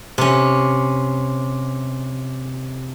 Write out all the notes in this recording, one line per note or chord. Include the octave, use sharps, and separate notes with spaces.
C3 C#4